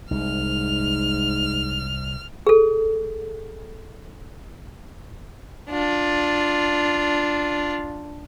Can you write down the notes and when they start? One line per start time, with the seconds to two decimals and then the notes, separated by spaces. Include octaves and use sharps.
0.11 C2 G#2 F6
2.47 G#4 A4
5.70 D4 F4